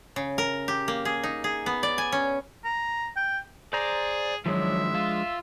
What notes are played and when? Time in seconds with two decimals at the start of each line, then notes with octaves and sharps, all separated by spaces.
0.16 C#3
0.38 A#4
0.68 G4
0.88 A#3
1.05 G#4
1.23 D#4
1.44 G#4
1.66 B3
1.83 D5
1.98 G#5
2.12 C#4
2.64 A#5
3.16 G5
3.73 G#4 C5 D5 A#5
4.46 G#2 D#3 F3 F#3 G#3 D4 E5
4.94 F4 F5 E6